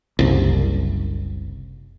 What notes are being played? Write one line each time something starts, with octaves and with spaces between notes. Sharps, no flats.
F#1 C2